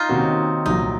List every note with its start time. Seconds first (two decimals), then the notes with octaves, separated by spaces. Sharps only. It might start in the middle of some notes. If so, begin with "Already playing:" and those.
Already playing: D#4 F4
0.09 C3 D#3 A#3 C#4 F#4
0.66 C2 A#2 F#3 D#4